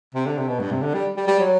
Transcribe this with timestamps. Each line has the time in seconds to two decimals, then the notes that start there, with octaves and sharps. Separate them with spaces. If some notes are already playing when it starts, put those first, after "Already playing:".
0.15 C3
0.26 D3
0.37 C3
0.49 B2
0.60 G2
0.71 C3
0.82 D3
0.94 G3
1.17 G3
1.28 G3
1.39 F#3